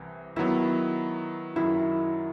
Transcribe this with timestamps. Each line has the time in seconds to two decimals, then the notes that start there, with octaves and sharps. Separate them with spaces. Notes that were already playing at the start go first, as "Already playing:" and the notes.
Already playing: C2 C3 E3
0.36 D#3 F#3 B3 E4
1.56 F#2 D#3 F#3 E4